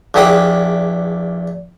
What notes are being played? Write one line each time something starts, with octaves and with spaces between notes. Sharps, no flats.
A#1 E2 G4 G#4 F#5 G5